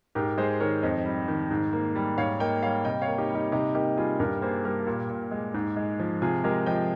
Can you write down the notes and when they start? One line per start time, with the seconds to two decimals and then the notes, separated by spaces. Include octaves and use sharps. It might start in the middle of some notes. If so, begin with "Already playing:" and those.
0.15 G#2 G4 A#4
0.38 G#3 G#4 C5
0.60 D#3 A#4 C#5
0.83 F2 C5 D#5
1.05 G3
1.28 D#3
1.51 G#2
1.73 A#3
1.95 G3
2.18 G#2 C#5 F5
2.40 A#3 D#5 G5
2.62 G3 C#5 F5
2.85 C3 D#5 G5
3.02 C#5 F5
3.08 A#3
3.18 D#4 G4
3.30 G3
3.35 D#4 G4
3.52 C3 D#4 G4
3.75 A#3 D#4 G4
3.97 G3 F4 G#4
4.20 G2 G4 A#4
4.42 A#3 G#4 C5
4.64 G3 G4 A#4
4.87 A#2
5.09 A#2
5.31 G#3
5.54 G#2
5.77 G#3
5.99 F3
6.22 C3 F4 G#4
6.44 G#3 G4 A#4
6.66 F3 D#5 G5